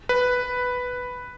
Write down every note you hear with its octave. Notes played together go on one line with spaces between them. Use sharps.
B4